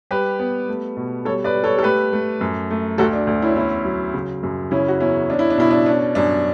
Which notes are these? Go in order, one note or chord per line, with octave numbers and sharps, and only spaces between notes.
G3 G4 B4
B3
A3
B2
G3 A4 C#5
B4 D5
G3
A4 C#5
A4
A3 G4 B4
A3
F#2
A3
D2 F#4 A4
D4
D2
C#4 E4
E2 C#4 E4
F#3
C#3
F#2
C#3 C#4 E4
F#4
E2 C#4 E4
C#4 D4
E4
D4
B2 E4
D4
C#4 D4
F#2 D4